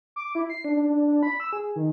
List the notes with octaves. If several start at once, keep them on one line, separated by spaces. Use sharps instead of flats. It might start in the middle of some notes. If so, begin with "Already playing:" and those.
D6
E4
C7
D4
D4
D4
D4
B5
E6
G#4
D#3